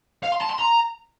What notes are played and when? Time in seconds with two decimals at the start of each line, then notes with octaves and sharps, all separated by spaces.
0.23 F5
0.32 C6
0.41 A5
0.50 C6
0.59 A#5